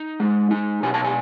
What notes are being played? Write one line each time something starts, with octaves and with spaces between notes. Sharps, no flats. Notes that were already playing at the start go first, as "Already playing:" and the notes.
Already playing: D#4
G#3
D#4
B2 G#5
A5
G#5